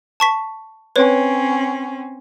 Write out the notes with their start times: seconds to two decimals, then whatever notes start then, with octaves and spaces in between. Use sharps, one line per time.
0.20 A5 C#6 B6
0.96 C4 C#4 B4 C#5